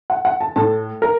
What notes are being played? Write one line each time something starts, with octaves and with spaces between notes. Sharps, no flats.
F#5
F#5
A5
A2 A5
A#4